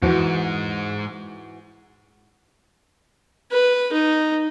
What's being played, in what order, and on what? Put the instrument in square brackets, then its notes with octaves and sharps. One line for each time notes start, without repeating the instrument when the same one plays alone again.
[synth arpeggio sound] E2 F3 [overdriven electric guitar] G#2 [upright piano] E3 F#4
[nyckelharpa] B4
D#4